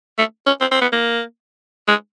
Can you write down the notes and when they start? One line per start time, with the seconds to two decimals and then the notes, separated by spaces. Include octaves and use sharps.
0.18 A3
0.46 C#4
0.61 C4
0.71 C4
0.81 B3
0.92 A#3
1.88 G#3